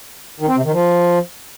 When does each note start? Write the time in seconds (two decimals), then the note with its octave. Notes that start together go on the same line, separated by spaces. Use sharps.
0.40 D#3
0.48 C4
0.57 C3
0.65 D#3
0.73 F3